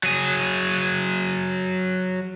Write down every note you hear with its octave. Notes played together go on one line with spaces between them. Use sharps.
F#3 G#4